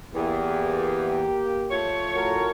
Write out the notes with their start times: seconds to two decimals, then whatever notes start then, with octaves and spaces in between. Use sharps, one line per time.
0.14 E2 A#3 G4
1.71 F3 A3 C#5
2.15 A2 F#4 A#4